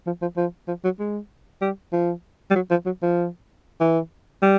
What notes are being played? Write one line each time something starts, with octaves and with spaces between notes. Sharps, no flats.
F3
F3
F3
F3
F#3
G#3
G3
F3
G3
F#3
F3
F#3
F3
E3
G3